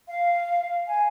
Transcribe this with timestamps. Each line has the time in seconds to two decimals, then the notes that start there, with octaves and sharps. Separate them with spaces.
0.10 F5
0.87 G#5